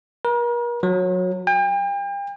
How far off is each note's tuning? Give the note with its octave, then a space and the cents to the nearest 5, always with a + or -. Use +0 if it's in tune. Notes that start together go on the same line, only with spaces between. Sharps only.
A#4 +40
F#3 -20
G5 +40